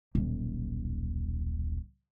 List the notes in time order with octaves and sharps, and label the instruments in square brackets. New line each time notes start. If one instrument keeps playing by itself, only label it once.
[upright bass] D#1 B1